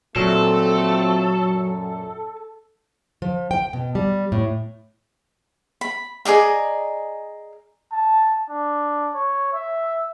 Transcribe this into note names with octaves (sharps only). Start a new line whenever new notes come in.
A#2 F3 F#3 A3 C4 A4
F#2
F3
G5
B2
G3
A2
B5
G#4 D5 D#5 A#5
A5
D4
C#5
E5